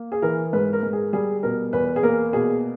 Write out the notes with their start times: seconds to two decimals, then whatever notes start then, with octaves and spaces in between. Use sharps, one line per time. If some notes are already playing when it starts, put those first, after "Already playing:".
Already playing: A#3
0.12 G#4
0.22 E3 A#4
0.53 G#2 B4
0.73 A#4
0.83 G#2
0.93 G#4
1.13 G3 G#4
1.43 B2 A#4
1.73 E2 B4
1.96 G#4
2.03 A#3 A#4
2.33 B2 G#4